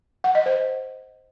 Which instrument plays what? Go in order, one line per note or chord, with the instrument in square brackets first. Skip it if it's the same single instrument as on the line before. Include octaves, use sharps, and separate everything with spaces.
[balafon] F#5
D#5
C5